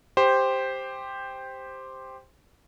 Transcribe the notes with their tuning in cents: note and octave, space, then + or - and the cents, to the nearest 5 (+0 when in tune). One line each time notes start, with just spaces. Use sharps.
G4 +5 C5 +0